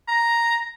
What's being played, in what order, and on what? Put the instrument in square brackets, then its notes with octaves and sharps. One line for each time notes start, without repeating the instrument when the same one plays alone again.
[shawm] A#5